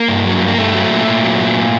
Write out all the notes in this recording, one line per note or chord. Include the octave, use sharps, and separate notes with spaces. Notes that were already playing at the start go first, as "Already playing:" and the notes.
Already playing: A#3
G2
F#3
G2
A#3
G2 A3
F#3
A#2
A#2
F#3
A#2